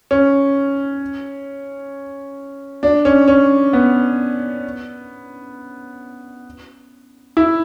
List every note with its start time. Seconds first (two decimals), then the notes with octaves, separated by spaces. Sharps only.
0.11 C#4
2.83 D4
3.05 C#4
3.28 C#4
3.73 B3
7.37 E4